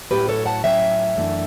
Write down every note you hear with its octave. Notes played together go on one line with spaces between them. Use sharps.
A2 F#3 C#4 G4 B4
A4 C#5
F#5 A5
A2 F#3 C#4 E5 G5
F#2 E3 A3 D4